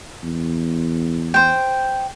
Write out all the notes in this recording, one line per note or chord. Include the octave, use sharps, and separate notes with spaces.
E2
C5 G5